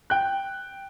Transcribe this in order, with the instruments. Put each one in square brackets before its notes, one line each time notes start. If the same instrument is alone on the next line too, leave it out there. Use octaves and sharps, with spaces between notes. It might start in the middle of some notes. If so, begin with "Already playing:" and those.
[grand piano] G5 F#6